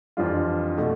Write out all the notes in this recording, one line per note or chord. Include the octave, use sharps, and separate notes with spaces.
F2 E3 G3 D4 F4
B2 A3